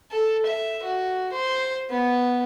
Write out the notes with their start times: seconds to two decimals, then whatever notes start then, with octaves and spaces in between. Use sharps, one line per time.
0.11 A4
0.46 E5
0.83 F#4
1.32 C5
1.90 B3